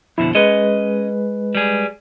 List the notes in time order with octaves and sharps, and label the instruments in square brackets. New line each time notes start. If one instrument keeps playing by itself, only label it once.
[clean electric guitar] F2 B2 D3 [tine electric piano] E4
[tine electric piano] G#3 B4 [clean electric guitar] C#4 D#5
[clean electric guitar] G3 G#4